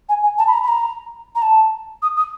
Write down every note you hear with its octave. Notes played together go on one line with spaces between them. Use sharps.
G#5
G#5
A5
B5
A#5
B5
A#5
A#5
A5
D#6
D#6